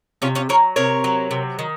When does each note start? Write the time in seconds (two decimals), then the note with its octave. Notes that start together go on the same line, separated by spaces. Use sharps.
0.22 C3 C#4 F4
0.35 C#4 F4
0.49 F#3 A#4 C#5
0.76 C3 A#4 C#5
1.04 F#3
1.31 C3
1.59 D#3